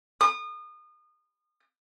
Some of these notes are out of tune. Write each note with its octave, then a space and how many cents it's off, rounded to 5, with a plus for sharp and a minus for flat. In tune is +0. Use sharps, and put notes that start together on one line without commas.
D#6 -30